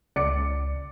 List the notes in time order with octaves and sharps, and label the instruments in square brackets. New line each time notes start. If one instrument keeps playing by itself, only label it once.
[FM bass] C#2 [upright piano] D5 C#7